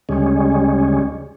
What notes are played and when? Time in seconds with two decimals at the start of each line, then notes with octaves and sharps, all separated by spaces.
0.09 D2 C#3 G3 G#3 C#4